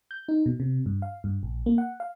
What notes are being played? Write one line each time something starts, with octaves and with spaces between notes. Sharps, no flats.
G6
D#4
B2
C3
G2
F5
G2
A#1
A#3
F#5
F5